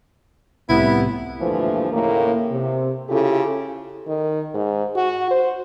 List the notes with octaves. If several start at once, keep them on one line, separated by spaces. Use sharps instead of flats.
C2 F2 A2 C3 B3 E4
D2 G2 A#2 E3 F3 A3
D#2 A2 C#3 A#3
C3
C#3 E4 F4 G4 A4
D#3
G#2
F#4
C5